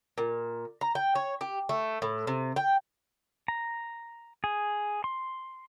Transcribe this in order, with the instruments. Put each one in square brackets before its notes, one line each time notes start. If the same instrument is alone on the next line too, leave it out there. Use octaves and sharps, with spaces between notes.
[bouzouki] A#2
A#5
G5
C#5
G4
A3
A2
C3
G5
[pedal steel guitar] A#5
G#4
C6